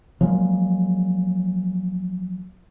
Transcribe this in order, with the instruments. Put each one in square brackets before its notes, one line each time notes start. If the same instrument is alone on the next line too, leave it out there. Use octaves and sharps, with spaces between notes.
[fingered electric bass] F3 F#3 G#3 A#3